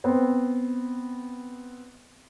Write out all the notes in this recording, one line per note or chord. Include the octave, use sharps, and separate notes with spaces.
B3 C4